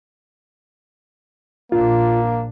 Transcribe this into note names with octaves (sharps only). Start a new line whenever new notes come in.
A#1 A#3 D4 F4